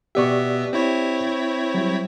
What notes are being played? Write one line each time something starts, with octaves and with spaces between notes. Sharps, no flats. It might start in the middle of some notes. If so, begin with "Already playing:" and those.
B2 B3 G4 D5 E5 C#6
C4 E4 C#5
F#3 G3